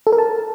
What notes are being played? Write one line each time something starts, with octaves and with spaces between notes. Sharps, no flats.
A4
A#4
A5